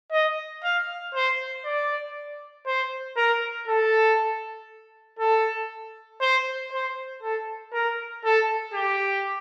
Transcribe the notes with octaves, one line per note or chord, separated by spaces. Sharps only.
D#5
F5
C5
D5
C5
A#4
A4
A4
C5
C5
A4
A#4
A4
G4